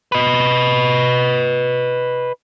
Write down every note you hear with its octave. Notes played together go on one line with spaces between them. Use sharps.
B4 D#5